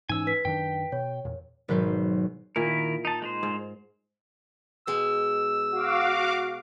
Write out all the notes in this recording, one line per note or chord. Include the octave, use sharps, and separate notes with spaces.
G#2 E3 C#4 D#4 G#5 E6
B4 B6
F#2 D#3 D4 G5
B2 C#5
E2 A#2
G#1 B2 F#3 B4 C5
A#2 D#3 E4 A#4
D#4 A5
G#3 D#4 C5
G#2
B2 G#3 E6
F#4 F5 D6